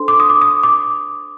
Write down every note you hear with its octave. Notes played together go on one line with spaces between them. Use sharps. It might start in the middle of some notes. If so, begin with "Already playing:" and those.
Already playing: D4 A4 C5 C6
D6
D#6
D6
D#6
D6